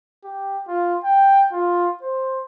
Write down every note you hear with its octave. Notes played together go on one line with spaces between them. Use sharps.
G4
F4
G5
F4
C5